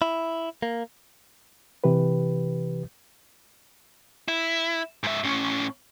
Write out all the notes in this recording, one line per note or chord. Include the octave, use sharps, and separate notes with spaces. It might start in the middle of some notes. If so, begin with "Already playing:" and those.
E4
A#3
C3 E3 G4 B4
E4
G#2 E5
A2 C#4